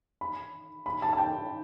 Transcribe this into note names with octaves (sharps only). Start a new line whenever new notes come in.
B5
B5
A5
A5
G5